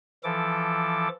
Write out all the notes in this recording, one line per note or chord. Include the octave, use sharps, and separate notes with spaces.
E3 F3 A4 D6